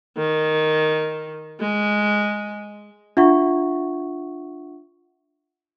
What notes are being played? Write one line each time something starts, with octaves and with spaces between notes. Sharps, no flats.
D#3
G#3
D4 F4 E5 F#5 C#6